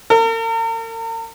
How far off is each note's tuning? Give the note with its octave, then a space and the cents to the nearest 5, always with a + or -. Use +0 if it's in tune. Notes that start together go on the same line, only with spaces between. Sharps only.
A#4 -45